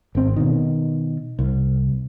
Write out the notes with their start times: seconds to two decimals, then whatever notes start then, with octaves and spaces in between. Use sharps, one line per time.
0.15 G#1 C4
0.36 B2 D#3
1.39 C2